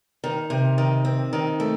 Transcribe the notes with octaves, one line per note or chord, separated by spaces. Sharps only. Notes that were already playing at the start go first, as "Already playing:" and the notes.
D#3
C3
D#3
C4
D#3
A3